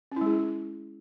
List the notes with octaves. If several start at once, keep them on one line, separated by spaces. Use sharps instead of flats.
G#3 C#4 E4 G#4